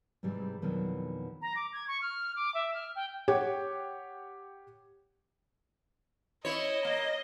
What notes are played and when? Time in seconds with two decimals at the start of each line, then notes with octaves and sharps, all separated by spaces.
0.23 G#2 C3 E3 G3 G#3
0.62 F2 B2 D#3 E3 F#3 G3
1.42 A#5
1.56 D6
1.73 G#6
1.88 C#6
2.01 F6
2.36 D6
2.55 E5
2.74 F6
2.96 G5
3.28 G4 C#5 F#5
6.45 E4 C#5 D#5
6.85 A#3